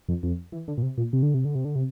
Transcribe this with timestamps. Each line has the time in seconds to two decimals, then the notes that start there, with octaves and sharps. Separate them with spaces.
0.09 F2
0.23 F2
0.52 E3
0.68 D3
0.77 A#2
0.82 C3
0.98 A#2
1.13 C3
1.23 D3
1.34 C3
1.45 D3
1.55 C3
1.65 D3
1.75 C3